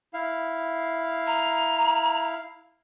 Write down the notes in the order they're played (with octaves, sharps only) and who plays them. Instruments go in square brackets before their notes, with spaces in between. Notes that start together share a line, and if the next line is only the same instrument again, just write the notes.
[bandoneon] E4 F5
[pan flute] A#5